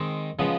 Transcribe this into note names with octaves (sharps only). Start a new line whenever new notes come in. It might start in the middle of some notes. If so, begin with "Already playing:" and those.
Already playing: D#3 G#3 C4
C#3 F3 G#3 B3